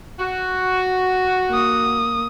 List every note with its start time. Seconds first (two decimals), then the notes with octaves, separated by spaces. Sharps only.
0.19 F#4
1.49 A#3 D#6